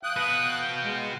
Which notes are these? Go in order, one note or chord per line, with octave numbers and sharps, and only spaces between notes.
F5 G5 D#6 F#6
F#4 B4
G#3